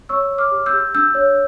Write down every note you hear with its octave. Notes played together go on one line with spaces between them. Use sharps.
C#5 C#6 E6
C#5
D6 F6
G4
E6 G6
G4
D4 E6 G6
C#5